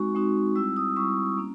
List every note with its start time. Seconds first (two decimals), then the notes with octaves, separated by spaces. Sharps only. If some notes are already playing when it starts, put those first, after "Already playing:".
Already playing: G#3 C4 D#4 F#4 C#6
0.15 G#3 C4 D#4 F#4
0.55 G3 C4 E4 E6
0.77 D#6
0.96 G3 C4 E4 C#6
1.37 A#3 C#4